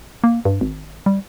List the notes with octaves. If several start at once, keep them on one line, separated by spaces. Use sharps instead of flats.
A#3
G2
G#1
G3